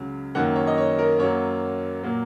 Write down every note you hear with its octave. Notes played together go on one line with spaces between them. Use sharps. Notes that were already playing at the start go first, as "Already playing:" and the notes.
Already playing: C#2 C#3 F#3
F#2 D#3 F#3 A#3 F#5
C#5
D#5
C#5
A#4
F#2 F#3 A#3 C#5
A#2 F#3 A#3